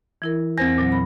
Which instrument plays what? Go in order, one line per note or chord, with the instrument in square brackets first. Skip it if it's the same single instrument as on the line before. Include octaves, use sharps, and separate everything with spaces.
[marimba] E3 E4 A#4
[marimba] E2 E3 [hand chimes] C4 C5 A#6
[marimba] A#2 F#3
B5